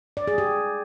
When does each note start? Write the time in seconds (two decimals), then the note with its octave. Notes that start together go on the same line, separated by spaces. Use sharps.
0.17 D5
0.27 G#4
0.38 G4